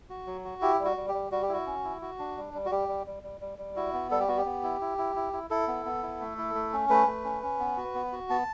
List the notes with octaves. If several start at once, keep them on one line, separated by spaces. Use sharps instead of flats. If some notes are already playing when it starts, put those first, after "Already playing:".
F#4
F#3
F#4
E4 G4
G3
F#4
G3
G4
G3
G3 F#4
G4
E4 F#4
C#4
E4
F#4
D4
G3
G3
F#4
G3 G4
G3
G3
G3
G3
G3
E4 F#4
B3
G3 A4
G4
B3 F#4
G4
B3
E4
E4
E4
E4
E4
E4 A4
B3
B3
E4
A3
E4
A3
C#4
A3 B4
A3
C#4
C#4
B3
F#4
B3
F#4
B3 A5